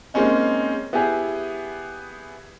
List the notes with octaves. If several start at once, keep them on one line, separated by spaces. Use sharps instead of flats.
G#3 A#3 C4 C#4 D#4
B3 E4 G4 G#4